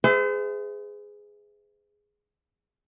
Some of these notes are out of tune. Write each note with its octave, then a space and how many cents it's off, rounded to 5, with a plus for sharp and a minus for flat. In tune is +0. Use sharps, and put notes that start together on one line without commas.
G#4 +0 C5 -45 E5 +0